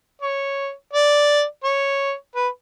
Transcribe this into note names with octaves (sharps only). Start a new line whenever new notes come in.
C#5
D5
C#5
B4